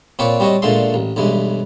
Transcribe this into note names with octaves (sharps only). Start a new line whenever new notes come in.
A#2 C4 B4 C#5 D5
G3 C4 F#4 C#5 D#5
A#2 D3 G#3 A3 G#4 C6
A1
B1 G2 E3 G#3